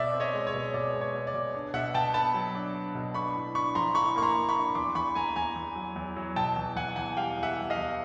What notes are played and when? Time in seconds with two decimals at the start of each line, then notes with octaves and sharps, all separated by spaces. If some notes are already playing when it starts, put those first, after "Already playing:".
Already playing: B2 D5 E5
0.14 C4
0.20 C#5 D#5
0.34 G#3
0.47 C#5
0.54 B2
0.74 B2 D5
0.93 G#3
1.01 C#5
1.14 B2
1.27 D5
1.34 B2
1.55 D4
1.74 B2 E5 F#5
1.94 B2 G5 A5
2.14 B3 A5 B5
2.34 F#3
2.55 D4
2.75 D4
2.95 B2
3.14 D4 B5 C#6
3.35 A2
3.55 D4 B5 C#6
3.75 F3 A#5 C6
3.95 A2 B5 C#6
4.16 A#3 C#6
4.22 A#5 C6
4.35 A#3
4.49 B5 C#6
4.56 D4
4.75 E2 C6 D6
4.95 E2 B5 C#6
5.15 E2 G#5 A#5
5.36 E2 G#5 A#5
5.56 E2
5.76 F#3
5.96 E2
6.16 F#3
6.36 B2 G5 A5
6.56 E2
6.76 E2 F#5 G#5
6.96 E2 F#5 G#5
7.17 G3 F5 G5
7.37 E2
7.43 E5 F#5
7.57 G3
7.70 D#5 F5
7.77 E2